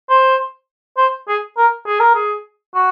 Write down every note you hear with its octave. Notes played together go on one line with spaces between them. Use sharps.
C5
C5
G#4
A#4
G#4
A#4
G#4
F#4